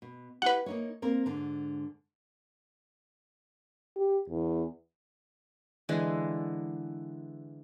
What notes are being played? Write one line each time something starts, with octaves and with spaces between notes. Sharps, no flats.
B2
E4 G4 B4 F#5
A#3 D#4 C#5
A#3 C4 A#4
G#2 D3
G4
E2
D3 E3 G#3